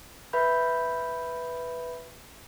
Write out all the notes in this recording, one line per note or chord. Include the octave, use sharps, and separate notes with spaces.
B4 E5 B5 G6